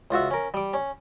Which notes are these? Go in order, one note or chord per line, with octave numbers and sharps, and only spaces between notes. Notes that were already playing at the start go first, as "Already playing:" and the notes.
C#2 F4 F#4 E5
C#4 A#4
G3 D6
C#4